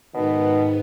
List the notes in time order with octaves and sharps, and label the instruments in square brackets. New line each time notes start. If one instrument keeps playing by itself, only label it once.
[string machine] G#2 B3 [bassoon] B2 [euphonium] D#3